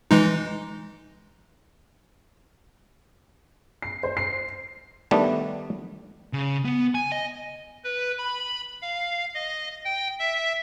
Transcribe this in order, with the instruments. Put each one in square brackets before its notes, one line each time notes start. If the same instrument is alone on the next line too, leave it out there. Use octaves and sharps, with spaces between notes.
[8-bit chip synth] E3 G#3 D#4
[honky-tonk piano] C7
C5
C7
[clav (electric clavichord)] D#3 G3 A3 B3 D4
[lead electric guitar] C#3
B3
G#5
D#5
[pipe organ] B4
B5
F5
D#5
G5
E5